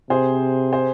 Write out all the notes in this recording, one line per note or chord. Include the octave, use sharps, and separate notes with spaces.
C3 G#4 C5
G#4 C5